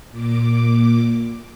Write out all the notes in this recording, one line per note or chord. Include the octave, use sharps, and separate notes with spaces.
A#2 D6